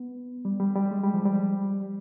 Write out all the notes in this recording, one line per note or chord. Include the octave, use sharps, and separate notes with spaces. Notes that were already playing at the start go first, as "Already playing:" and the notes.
Already playing: B3
G3
G3
G3
G#3
G3
F3
G3